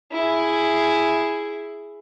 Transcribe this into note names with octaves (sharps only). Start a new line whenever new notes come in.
E4 G#4